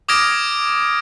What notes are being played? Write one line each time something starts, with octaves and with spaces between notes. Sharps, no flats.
D6 D#6 F6 G#6 A#6 D7